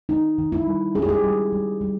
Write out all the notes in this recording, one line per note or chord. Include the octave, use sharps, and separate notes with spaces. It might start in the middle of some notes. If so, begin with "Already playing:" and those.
D#3 D#4
D#3
E4
G3
C#4 G#4
G4
G#4
G3
G3
G3